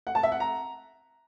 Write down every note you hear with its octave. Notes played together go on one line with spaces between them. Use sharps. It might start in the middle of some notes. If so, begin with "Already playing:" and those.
F#5
A5
E5
F#5
A#5